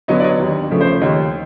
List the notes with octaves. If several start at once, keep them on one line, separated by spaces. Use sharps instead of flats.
D3 F#3 B3 C#5 D#5
D5
C#5 D#5
D#2
C#3 F3 A3
C5
D#2 C#5 D#5